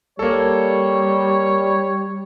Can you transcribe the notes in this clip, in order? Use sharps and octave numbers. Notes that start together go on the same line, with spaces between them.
G3 A#3 A4 C#5